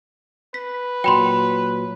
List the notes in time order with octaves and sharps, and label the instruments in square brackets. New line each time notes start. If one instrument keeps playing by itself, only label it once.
[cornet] B4 [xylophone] B6
[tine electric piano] A#2 F#3 [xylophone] G5 B5 C6